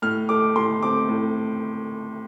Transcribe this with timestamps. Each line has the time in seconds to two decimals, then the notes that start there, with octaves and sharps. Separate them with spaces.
0.02 A2 F6
0.29 A3 D6
0.56 A2 C6
0.83 C4 D6
1.09 A2